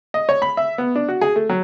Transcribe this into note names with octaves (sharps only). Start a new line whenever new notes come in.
D#5
C#5
B5
E5
B3
D4
F#4
G#4
A3
F#3